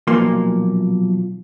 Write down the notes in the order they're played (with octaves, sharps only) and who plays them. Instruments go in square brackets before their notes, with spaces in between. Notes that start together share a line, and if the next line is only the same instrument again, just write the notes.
[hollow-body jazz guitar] B1 A#2 F3 A#3 C6